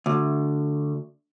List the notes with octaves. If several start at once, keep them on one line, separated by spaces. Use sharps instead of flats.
D2